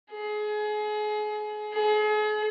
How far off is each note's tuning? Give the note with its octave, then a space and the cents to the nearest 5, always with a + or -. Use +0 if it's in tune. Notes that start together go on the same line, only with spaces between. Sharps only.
G#4 +30
G#4 +40